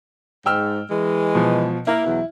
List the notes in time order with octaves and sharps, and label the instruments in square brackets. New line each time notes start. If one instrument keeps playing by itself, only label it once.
[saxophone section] G#2 [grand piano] G5 E6 F6
[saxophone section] E3 G#3
[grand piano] B2 F3
[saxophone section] A#3 [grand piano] E4
[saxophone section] E2 B2 F#3